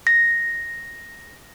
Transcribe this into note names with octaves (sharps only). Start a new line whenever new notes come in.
A#6